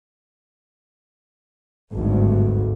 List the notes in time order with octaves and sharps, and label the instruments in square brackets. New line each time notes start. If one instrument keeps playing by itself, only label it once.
[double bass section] G#1 D2 G2